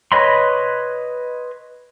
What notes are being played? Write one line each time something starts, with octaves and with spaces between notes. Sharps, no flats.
B4 C#5 D#5 B5 C6